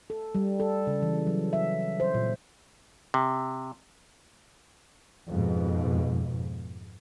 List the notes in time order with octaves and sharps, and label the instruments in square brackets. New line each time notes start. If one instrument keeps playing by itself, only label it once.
[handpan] A4
G3
A4
C#3
E3
F#3
E5
C5
A#2
[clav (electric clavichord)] C3
[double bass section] F2 G#2 B2